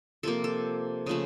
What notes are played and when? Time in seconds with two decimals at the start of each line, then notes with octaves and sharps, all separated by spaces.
0.23 C3 F3 A#3 A4
0.44 A4
1.06 C#3 F3 A3